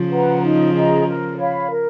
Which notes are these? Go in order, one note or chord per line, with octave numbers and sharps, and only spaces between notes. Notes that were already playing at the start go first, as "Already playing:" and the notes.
Already playing: C#3 F3
B4 F#5 A#5
D#4
G#4 D#5 A#5
A#4
C#5 F5 B5
A#4